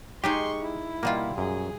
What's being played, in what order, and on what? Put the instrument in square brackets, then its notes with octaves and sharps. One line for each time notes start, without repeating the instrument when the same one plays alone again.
[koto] G#3 D#4 G#4 [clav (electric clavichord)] G4 [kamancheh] C6 C#6
[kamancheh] E4
[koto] B2 G3 F4 [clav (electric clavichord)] A#3
[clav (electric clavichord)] F#2 [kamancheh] G#4